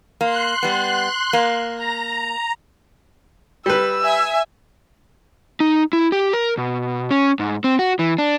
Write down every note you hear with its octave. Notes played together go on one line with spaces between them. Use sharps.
A#3 C6 F#6
G3 B3
A#3
A#5
G3 B4 E6
E5 G#5
D#4
E4
G4
A#4
B2
C#4
G#2
C4
F#4
E3
D4